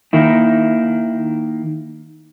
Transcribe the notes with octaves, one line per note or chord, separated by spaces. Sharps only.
D#3 A#3 E4